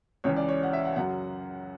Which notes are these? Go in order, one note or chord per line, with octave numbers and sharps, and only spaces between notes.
C#2 C#3 E3 C#5
D5
C#5
F#5
E5
F#5
F#2 C#3 F#3 F#5